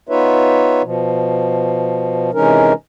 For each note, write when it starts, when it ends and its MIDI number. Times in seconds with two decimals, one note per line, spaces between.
0.09 0.82 59
0.09 0.82 63
0.09 0.82 65
0.09 0.82 71
0.09 0.82 73
0.09 0.82 76
0.83 2.31 47
0.83 2.31 53
2.34 2.73 48
2.34 2.73 52
2.34 2.73 56
2.34 2.73 61
2.34 2.73 63
2.34 2.73 70